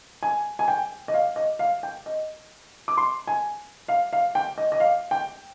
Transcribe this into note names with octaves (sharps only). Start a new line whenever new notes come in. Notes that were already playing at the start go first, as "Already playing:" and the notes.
G#5
G#5
G5
D#5
F5
D#5
F5
G5
D#5
D6
C6
G#5
F5
F5
G5
D#5
D#5
F5
G5